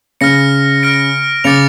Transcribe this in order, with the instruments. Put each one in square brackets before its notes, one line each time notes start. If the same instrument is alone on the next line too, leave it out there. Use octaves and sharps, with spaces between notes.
[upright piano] C#3 [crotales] F6 A#6 C#7
[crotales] F6 A#6 D7
[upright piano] C#3 [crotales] D6 A6 C#7 F7